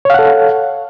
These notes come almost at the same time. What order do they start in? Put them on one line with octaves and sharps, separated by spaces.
C#5 F5 F#5 A4